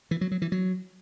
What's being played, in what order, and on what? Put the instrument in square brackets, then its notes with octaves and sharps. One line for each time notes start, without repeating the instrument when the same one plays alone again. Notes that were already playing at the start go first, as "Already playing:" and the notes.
[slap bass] E3
F#3
F#3
E3
F#3